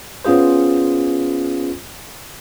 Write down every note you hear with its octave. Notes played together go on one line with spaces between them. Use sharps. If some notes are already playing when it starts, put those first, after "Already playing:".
B3 C#4 F4 G#4 C5